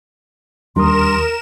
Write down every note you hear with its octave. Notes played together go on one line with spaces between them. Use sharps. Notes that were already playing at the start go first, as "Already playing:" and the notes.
D#2 G3 D4 A#4 A#5 C6 D#6 E7